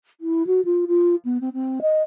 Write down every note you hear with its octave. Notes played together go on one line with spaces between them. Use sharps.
E4
F#4
F4
F4
B3
C4
C4
D#5